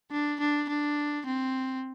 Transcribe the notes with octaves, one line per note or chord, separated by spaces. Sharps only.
D4
D4
D4
C4